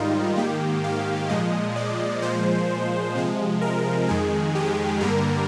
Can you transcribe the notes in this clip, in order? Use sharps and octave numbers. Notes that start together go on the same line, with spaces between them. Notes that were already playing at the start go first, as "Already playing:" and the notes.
Already playing: G#2 D#3 G3 D#4 F4
G#2 D#3 A#3 G4
F5
A#2 F3 G#3 D#5
D5
A#2 F3 G#3 C5
C3 F3 G#3
A#4
F2 D#3 G#3 G#4
G4
G2 D3 G3 A#3 A#4